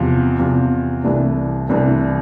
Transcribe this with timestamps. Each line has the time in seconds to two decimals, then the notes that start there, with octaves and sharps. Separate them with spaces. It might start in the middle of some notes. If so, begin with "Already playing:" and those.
Already playing: E2 C3 F3
0.39 E2 C3 F3
1.04 C2 C3 E3 A3 D4
1.69 C2 C3 E3 A3 D4